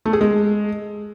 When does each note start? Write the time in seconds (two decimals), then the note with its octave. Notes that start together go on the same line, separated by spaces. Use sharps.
0.06 A3
0.13 G#4
0.21 G#3